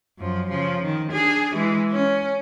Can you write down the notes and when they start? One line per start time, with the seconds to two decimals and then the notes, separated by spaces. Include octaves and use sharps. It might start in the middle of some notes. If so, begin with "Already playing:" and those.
0.18 F#2 F3
0.50 C#3 F3
0.83 D#3
1.12 D4 G#4
1.54 E3 G#3
1.91 C#4